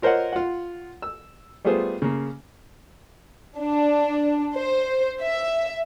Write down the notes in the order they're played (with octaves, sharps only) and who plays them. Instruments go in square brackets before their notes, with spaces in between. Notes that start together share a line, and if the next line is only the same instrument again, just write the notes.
[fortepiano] F4 A#4 C5 C#5 D#5 F#5
F4 F#5
E6
G3 A3 B3 F4 G#4 C5
C#3 A#3
[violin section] D4
C5
E5